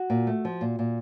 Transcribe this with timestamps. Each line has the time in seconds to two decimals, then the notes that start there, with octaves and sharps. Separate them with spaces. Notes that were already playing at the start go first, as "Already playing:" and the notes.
Already playing: F#4
0.10 A#2
0.27 A3
0.45 F3
0.61 A#2
0.79 A#2